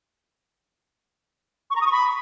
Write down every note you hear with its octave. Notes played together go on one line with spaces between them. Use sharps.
C#6
A#5
D#6
C#6
B5